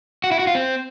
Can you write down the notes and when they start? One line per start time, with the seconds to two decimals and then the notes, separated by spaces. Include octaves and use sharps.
0.24 F#4
0.32 E4
0.39 F#4
0.47 F4
0.55 C4